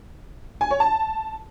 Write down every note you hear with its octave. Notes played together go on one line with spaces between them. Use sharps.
G#5
C#5
A5